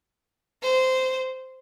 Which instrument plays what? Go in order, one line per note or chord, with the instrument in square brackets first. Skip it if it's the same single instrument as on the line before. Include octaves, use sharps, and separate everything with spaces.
[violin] C5